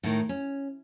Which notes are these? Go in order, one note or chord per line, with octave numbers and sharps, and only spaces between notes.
A2 D#3
C#4